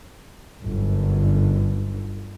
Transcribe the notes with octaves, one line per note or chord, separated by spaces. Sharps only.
G1 F#2 D3